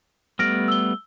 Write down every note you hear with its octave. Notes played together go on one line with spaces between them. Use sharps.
G3 A3 B3 F6 A#6 D7
E6 G7